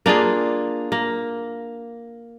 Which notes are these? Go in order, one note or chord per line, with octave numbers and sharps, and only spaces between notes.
A#3 D4 F4 G#4
A#3